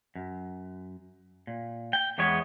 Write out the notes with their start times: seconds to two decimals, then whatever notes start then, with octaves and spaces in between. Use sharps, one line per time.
0.15 F#2
1.47 A#2
1.93 G5
2.18 E2 E3 G#3 B3 C#5